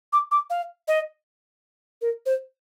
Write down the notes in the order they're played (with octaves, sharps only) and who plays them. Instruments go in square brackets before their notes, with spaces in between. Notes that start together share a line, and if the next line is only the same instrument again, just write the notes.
[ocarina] D6
D6
F5
D#5
A#4
C5